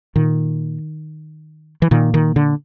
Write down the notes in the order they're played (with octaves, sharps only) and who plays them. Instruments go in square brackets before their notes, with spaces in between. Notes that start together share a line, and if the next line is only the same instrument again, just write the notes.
[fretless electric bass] A#2 D#3
E3
A#2 D#3
D#3
D3